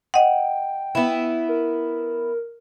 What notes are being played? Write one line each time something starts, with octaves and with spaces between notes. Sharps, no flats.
D#5 F#5 G5
B3 E4
A#4